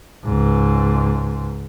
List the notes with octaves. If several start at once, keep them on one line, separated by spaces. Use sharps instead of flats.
C#2 G#2